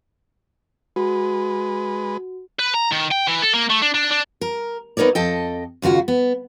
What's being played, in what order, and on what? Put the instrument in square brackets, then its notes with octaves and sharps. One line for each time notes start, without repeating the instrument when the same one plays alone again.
[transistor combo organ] G#3 B4 [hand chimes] F#4
[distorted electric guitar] B4
A#5
D#3
G5
E3
A4
A#3
A3
D4
D4
D4
[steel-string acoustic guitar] A#4
B3 D#4 A#4 C#5 D5
F2 A4 D#5 G5
D#2 C#3 F4 F#4
B3